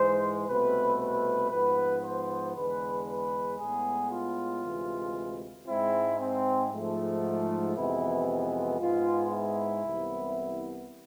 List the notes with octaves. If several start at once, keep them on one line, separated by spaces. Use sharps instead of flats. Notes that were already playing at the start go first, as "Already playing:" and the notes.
Already playing: G#2 E3 G#3 C5
C2 B2 A3 C4 B4
B4
G#2 F3 B3 B4
C5
E2 D3 G#3 B4
B4
A2 G#3 B3 G#4
F4
D2 C3 E3 G#3
G#2 G#3 C4 E4
C4
G#2 F3 A3
F2 C3 E3 G#3 B3 E4
G#2 G#3 B3 F4
E4
C2 C3 E3 B3